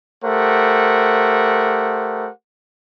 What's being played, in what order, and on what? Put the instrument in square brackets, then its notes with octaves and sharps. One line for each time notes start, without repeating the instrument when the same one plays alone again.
[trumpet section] A3 G4 A#4 C5 F#5